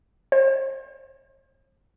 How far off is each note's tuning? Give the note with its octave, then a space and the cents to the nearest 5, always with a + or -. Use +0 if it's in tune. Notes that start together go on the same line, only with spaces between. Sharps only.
C5 +40